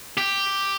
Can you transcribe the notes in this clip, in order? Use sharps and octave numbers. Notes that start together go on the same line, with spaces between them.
G4